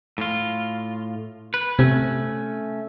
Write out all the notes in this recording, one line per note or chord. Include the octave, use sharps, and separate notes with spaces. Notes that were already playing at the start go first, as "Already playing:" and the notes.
A2 F4
B4
C3 A3 C#4